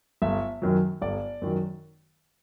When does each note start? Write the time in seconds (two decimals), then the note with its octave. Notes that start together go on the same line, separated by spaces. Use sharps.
0.22 G1 E5
0.62 F#2 D#3 F#3
1.02 G1 D5
1.42 F#2 D#3 F#3